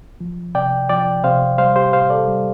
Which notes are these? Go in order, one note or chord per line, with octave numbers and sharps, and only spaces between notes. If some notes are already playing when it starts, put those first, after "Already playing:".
F3
C3 D5 G5
F3 D5 G5
C3 C5 F5
G3 C5 F5
G4 C5
A2 C5 F5
A4 D5
G3